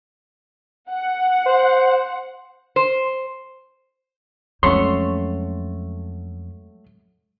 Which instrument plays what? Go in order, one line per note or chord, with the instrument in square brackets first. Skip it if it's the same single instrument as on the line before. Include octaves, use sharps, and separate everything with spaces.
[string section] F#5
[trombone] C5
[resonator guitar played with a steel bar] C5
[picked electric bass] F2 C#4 [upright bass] F#3 G#3 [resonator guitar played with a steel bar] A3 F#4 C#5 [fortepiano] C6